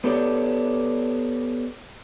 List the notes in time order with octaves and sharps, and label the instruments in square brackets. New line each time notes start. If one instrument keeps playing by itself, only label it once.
[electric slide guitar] B3 G4 A4 C#5 D5